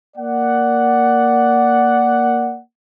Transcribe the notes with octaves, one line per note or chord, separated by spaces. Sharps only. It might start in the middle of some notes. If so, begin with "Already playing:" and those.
A#3 D5 F#5